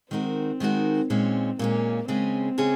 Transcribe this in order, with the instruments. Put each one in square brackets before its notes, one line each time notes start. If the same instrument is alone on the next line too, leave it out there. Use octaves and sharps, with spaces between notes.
[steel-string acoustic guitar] D#3 G#3 D#4 F#4 A#4 [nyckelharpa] C4
[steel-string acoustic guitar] D#3 G#3 D#4 F#4 A#4
[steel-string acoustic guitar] A#2 G#3 C#4 [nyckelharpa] C4
[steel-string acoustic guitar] A#2 G#3 C#4 [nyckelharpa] A#3
[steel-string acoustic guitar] C#3 G#3 C#4 G#4 [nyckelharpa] C4
[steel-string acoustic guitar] C#3 G#3 C#4 G#4